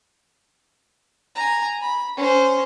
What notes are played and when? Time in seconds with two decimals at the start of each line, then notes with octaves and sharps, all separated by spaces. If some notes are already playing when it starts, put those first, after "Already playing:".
1.36 G#5 A#5
1.81 B5
2.17 C#4 C5